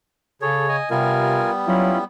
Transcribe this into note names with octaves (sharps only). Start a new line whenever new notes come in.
C#3 G#4 A4 C#5
D#5 G#5
C3 G3 B3 F4 A#4 G#5
F#3 C#4 E4 F4